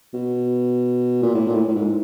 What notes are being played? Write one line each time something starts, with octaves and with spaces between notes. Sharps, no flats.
B2
A#2
A2
A#2
A2
A2
G#2